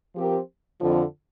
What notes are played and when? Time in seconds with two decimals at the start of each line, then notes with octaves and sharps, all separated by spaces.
0.15 F3 C4 G4 A#4
0.80 F2 D3 F3